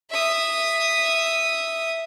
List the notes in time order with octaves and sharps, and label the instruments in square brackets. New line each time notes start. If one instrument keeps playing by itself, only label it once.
[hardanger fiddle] E5 D#6